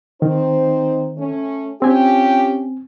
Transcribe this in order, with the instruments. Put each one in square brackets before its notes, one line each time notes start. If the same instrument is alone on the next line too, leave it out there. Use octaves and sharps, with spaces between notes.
[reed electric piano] D#3 [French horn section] C4 D#4 C5
[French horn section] A3 C#4
[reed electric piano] C4 G#5 [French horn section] C#4 F4 G4